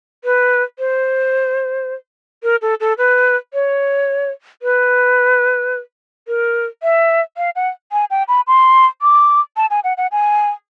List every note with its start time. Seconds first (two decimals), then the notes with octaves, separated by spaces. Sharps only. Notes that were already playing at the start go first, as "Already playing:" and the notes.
0.24 B4
0.79 C5
2.43 A#4
2.62 A4
2.80 A4
2.98 B4
3.54 C#5
4.62 B4
6.28 A#4
6.83 E5
7.37 F5
7.56 F#5
7.92 G#5
8.10 G5
8.28 B5
8.47 C6
9.02 D6
9.57 A5
9.70 G#5
9.84 F#5
9.97 F#5
10.12 G#5